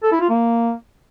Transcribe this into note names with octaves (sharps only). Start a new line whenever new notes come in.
A4
E4
F4
A#3